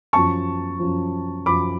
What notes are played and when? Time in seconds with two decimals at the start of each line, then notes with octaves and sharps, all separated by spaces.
0.13 F#2 F3 A5 C#6
0.79 F#2 F3
1.46 F#2 F3 B5 D6